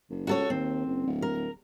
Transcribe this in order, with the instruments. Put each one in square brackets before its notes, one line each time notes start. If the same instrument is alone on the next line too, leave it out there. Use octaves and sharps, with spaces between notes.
[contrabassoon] F#1
[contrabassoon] C#2 [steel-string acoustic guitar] F#4 A4 C#5
[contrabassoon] D#2 [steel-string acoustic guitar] C4
[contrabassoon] F#1
D1
[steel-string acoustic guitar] A#4